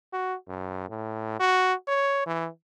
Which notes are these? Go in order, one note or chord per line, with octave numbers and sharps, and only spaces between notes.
F#4
F#2
A2
F#4
C#5
E3